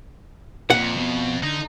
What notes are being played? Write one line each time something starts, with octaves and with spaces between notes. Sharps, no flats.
F2 A#2 F#5
B2
D3 D#4